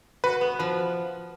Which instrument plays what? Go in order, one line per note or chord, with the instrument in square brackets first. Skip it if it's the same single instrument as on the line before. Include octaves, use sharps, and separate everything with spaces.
[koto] F#4 [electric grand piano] B4
[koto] B3
[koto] F3 [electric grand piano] B4